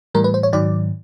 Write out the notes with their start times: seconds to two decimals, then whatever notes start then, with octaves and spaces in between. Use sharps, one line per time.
0.14 A2 E3 G3 A#4
0.24 B4
0.34 C5
0.43 C#5
0.53 G#2 D#3 F#3 D5